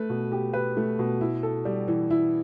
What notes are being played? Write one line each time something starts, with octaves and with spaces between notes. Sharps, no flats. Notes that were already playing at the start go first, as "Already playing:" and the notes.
Already playing: A3 B4
B2
G4
B4
A3
B2
E4
A4
G3
E3
E4